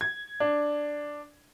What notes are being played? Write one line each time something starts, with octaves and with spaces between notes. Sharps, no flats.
G#6
D4